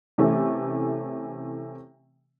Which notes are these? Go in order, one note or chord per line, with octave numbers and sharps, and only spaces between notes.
C3 E3 A3 C#4